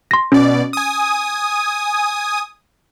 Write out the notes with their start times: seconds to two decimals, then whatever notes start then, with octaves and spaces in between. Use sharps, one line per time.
0.11 C6 A#6
0.32 B2 C#4 D5
0.73 G#5 D#6